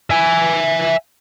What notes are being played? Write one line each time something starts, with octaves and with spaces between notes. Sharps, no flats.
E5 G#5